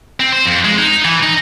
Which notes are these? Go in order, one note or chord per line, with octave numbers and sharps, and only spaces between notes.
C4
C5
F2
G#3
D#4
E3
D#4